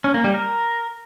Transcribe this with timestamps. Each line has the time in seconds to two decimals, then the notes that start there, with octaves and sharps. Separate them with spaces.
0.04 C#4
0.14 A#3
0.24 G3
0.34 A#4